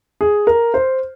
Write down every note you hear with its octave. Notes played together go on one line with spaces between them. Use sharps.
G#4
A#4
C5